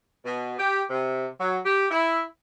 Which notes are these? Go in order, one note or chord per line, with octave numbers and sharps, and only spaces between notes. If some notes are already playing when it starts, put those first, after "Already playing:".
B2
G4
C3
F#3
G4
E4